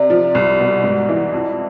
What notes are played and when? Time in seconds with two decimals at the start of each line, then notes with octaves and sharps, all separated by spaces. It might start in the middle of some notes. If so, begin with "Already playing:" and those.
Already playing: C3 D5
0.10 F3
0.35 C2
0.60 B2
0.83 G#2
1.09 E3
1.32 F2